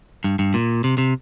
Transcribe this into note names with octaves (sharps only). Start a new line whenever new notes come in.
G2
G2
A#2
C3
C3